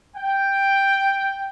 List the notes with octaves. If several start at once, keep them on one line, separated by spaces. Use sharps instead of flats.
G5